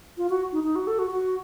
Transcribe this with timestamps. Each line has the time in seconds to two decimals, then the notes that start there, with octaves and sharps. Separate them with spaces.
0.18 F4
0.30 F#4
0.53 D#4
0.64 D#4
0.76 F#4
0.87 A4
0.99 F#4
1.11 F#4